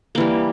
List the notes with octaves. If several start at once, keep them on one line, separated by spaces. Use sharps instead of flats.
E3 G3 A#3